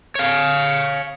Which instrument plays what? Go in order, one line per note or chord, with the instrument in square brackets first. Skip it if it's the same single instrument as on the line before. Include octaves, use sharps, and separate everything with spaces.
[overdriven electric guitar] C#5 F5